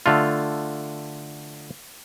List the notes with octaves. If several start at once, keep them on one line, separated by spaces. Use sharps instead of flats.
D3 A3 F4